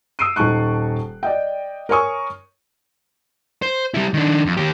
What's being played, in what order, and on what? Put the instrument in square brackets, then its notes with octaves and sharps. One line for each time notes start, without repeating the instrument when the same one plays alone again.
[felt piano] D#6 E6 C7 D7 D#7
D#1 D#4 A5 C#6 F#6
D5 D#5 G5
A#4 C#5 G#5 C#6 D#6
[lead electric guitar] C5
G3 E4
D#3 D4
F2
D#2 G4